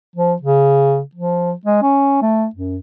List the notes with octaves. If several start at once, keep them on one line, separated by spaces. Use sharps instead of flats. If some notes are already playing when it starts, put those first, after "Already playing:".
F3
C#3
F3
G#3
C#4
A3
F#2